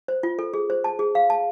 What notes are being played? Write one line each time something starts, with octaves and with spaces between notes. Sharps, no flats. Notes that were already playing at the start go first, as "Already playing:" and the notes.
C5
F4
A4
G#4
C5
A5
G#4
F5
A5